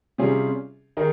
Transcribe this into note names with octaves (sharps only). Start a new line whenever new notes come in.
C3 G3 C#4 F4 G#4
D#3 D#4 G#4